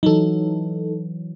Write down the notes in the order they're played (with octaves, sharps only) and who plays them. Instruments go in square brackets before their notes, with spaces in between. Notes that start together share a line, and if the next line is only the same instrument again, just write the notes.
[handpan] E3 F#3 [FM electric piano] D#4 A4